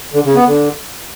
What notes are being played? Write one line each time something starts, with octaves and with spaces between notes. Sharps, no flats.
D3
C#3
B3
D3